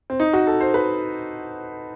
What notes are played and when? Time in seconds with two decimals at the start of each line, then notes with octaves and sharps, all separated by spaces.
0.10 C4
0.20 D#4
0.33 F#4
0.47 A4
0.61 C5
0.74 B4